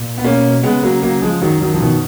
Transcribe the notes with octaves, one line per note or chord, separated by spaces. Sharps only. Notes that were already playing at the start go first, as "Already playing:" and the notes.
Already playing: A#2
B3
B2 A#3 C#4
C#3 G#3 B3
F#3 A#3
F#3 A#3
F3 G#3
F#2 D#3 F#3
D#3 F#3
F3
B2 D#3